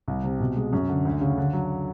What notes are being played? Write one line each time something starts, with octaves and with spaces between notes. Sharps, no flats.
C2
C3
B2
G#3
F#2
D3
D2
C#3
D3
F#3